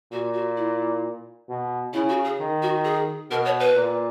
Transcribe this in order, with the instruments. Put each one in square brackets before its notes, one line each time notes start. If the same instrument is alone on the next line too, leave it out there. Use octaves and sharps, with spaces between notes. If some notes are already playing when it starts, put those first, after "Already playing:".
[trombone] A#2 [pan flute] F#4
[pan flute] F#4
E4
[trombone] B2
[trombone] C#3 [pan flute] E4
[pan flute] F#4
G#4
[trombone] D#3
[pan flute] F#4
G#4
[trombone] B2 [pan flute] A#4
[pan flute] C#5
B4
[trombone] A#2